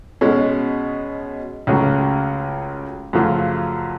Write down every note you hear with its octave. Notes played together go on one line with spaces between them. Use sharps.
B2 G#3 C#4
C#2 C#3 F#3 A3
F#2 C#3 F3 A3